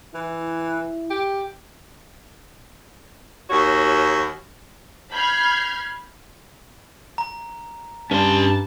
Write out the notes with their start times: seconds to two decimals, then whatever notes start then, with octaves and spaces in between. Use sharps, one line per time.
0.15 E3 E4
1.11 G4
3.49 D#2 F#4 C#5
5.12 B5 F6 G6 G#6 C7
7.18 A#5
8.11 G2 C#4 A5 C6